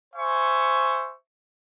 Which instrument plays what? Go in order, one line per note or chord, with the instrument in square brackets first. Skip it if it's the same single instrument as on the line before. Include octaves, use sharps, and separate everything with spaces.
[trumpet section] C5 E5 G#5 C#6